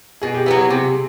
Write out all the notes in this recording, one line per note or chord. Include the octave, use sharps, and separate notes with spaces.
B2 G#4
G4
F#3 B3 E4 G4
G#4
C3 G4
G#4